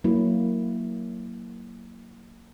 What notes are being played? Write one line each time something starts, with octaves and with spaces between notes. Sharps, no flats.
F#3 A#3 E4